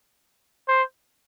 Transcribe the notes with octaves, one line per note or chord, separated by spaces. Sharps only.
C5